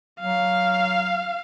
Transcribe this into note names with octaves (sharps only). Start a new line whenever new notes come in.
F#3 F5